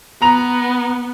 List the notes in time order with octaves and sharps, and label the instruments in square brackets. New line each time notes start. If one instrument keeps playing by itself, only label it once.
[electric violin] B3 [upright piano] A#5 F7